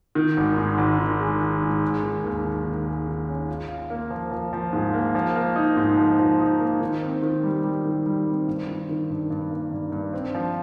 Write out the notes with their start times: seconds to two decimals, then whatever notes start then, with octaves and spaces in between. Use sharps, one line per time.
0.15 D#3
0.37 G#1
0.57 G#2
0.78 G#1
0.99 D#3
1.20 G#3
1.40 D#3
1.62 G#2
1.82 G#3
2.03 D#3
2.24 D#2
2.44 D#3
2.65 D#2
2.87 G#3
3.08 D#3
3.28 C#4
3.48 F4
3.69 F4
3.90 A#3
4.10 F3
4.32 F3
4.53 F3
4.73 G#2
4.94 A#3
5.15 F3
5.36 A#3
5.56 D#4
5.77 G#2
5.97 F3
6.19 F3
6.40 D#4
6.60 A#3
6.80 D#3
7.01 C4
7.22 D#3
7.43 G3
7.64 G3
7.85 D#3
8.06 G3
8.27 C4
8.48 G2
8.67 D#3
8.89 D#3
9.10 G2
9.30 G2
9.51 A#3
9.72 G2
9.92 G2
10.13 C4
10.35 F3